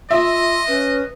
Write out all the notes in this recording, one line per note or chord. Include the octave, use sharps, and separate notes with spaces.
F4 D#5 E5 C6
C#4 B4